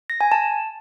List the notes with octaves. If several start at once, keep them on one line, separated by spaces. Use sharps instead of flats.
A#6
G#5
A5